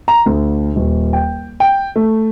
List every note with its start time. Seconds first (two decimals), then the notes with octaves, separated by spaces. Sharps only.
0.08 A#5
0.26 D2
0.76 D#1
1.13 G5
1.60 G5
1.96 A3